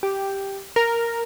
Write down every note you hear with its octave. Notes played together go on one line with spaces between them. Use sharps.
G4
A#4